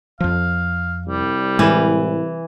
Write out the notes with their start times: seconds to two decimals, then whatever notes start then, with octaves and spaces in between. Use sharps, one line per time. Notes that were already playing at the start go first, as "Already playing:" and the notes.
0.20 F2 F3 F5
1.07 C2 G3
1.59 A2 E3 G#3